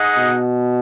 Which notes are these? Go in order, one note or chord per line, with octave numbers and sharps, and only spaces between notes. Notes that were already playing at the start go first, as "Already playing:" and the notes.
Already playing: D#4 G#4 D#5 F#5
B2